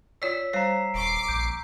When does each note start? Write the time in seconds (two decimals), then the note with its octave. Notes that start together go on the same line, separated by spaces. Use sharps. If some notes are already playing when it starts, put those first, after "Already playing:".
0.22 F4 C#5 D5 E6 B6
0.53 G3 C5 C#5 A#5 C7
0.94 D#1 C#6 D6 C7 D7
1.28 A#1 G6